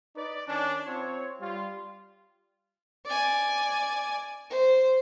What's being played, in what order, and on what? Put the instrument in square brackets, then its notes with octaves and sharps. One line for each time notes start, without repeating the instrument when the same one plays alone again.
[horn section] D#4 B4 D5
D#3 C#4 D4
C4 F4 C#5
G3 F4
[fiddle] D5 G#5
C5